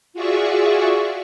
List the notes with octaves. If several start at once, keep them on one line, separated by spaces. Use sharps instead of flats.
F4 F#4 G#4 D5 E5 C#6